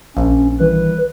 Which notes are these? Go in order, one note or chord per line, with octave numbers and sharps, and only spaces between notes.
A#1 C#4
D#3 E3 G3 B4